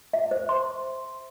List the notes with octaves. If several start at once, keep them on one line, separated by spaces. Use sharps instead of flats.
E5
C5
C6